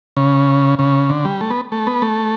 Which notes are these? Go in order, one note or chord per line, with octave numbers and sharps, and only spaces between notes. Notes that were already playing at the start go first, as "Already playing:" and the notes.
C#3
C#3
D3
G3
A3
B3
A3
B3
A3